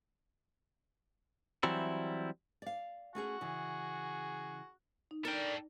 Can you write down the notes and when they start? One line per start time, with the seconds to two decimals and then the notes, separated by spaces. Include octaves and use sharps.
1.63 E3 F#3 G3 C4 E4
2.62 D5 F5
3.15 A3 C#4 F#4 G#4
3.41 C#3 E3 G#4
5.11 D#4
5.25 D4 A4 A#4 G5